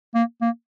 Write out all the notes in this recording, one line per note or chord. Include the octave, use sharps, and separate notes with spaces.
A#3
A#3